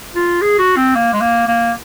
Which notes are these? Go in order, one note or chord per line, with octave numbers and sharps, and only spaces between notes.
F4
G#4
F#4
C4
A#3
G#3
A#3
A#3